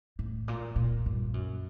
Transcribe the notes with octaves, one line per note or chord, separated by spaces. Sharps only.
A2
A#2
A#2
G2
F#2